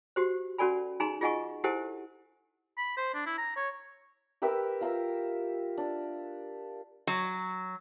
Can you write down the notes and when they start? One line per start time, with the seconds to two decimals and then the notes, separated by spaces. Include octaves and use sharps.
0.16 F#4 G4 C5
0.58 C#4 F#4 A4 D5 G#5 B5
1.00 D#4 G#4 G#5 A#5 C6
1.21 F4 G#4 D#5 F#5 G#5 C#6
1.64 E4 G4 A4 C5 F#5 G#5
2.78 B5
2.97 C5
3.14 D4
3.26 E4
3.38 A#5
3.57 C#5
4.42 G4 A#4 B4 E5
4.81 F4 E5 A#5 E6
5.77 D4
7.07 F#3